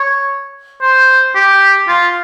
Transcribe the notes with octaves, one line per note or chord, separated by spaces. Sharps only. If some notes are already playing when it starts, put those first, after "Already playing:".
Already playing: C#5
C5
G4
F4